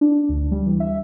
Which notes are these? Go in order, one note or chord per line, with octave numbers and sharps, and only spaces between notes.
D4
D2
G3
E3
E5